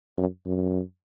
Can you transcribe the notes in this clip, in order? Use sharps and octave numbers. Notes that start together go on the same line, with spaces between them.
F#2
F#2